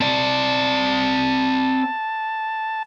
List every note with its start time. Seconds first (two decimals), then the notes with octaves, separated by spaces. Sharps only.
0.01 C4 D5 A5